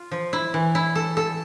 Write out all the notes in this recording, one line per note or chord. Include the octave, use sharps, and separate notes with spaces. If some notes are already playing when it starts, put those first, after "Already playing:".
Already playing: F4
F3
E4
E3
E4
A4
A4